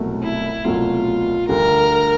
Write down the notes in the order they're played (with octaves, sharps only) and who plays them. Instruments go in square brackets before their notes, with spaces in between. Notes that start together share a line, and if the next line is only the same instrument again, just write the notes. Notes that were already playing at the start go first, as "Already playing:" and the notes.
Already playing: [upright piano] C2 B2 F#3 A3
[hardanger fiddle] E4
[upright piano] C2 B2 F#3 A3 [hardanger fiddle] F4
[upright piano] D2 D3 G3 [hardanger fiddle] A#4